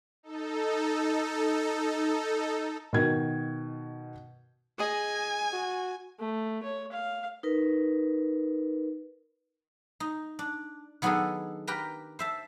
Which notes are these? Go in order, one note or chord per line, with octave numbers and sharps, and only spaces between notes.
D#4 A4
B2 D#3 G#6
G#4 D#5 G#5
F#4
A3
C#5
F5
D#4 A#4 B4
D#4
D4
D#3 F#3 B3 D4 G#4 A4
G4 A#4 B4 G5 A#5
C5 E5 A5